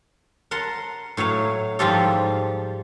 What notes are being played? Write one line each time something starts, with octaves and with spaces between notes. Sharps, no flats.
A#4 F#5 A5 C6
A2 F#3 C#5 F5
G#2 F3 G3 F4 G4 A4